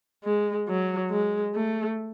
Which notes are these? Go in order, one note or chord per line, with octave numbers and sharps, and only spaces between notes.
G#3
F#3
G#3
A3